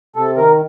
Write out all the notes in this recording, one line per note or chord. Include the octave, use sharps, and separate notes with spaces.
C3 A4
D#3 A#4